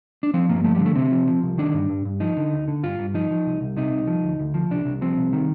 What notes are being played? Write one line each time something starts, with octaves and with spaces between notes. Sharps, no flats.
D4
F3 C4
G2 A#3
F3 A3
G3
D3
A3
C3 C4
F3
F3
C2
D#3 D4
G2
G2
G2
F3 D#4
D3
D2
D3
G2 F4
G2
F3 D#4
F3
C2
C2
C3 D#4
C2
F3
D2
D2
F3
C2 D4
C2
F3 C4
C2
D#3